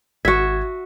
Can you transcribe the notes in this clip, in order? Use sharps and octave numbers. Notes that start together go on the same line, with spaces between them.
G#1 F#4 E5 G#6